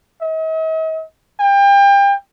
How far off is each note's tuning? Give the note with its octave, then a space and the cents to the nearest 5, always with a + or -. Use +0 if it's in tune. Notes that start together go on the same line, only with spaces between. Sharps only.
D#5 +45
G5 +30